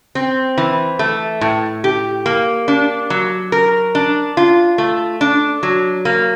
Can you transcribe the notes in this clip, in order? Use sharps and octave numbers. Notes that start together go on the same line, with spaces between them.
C4
E3
A3
A2
G4
A#3
D4
F#3
A#4
D4
F4
A3
D4
F#3
A#3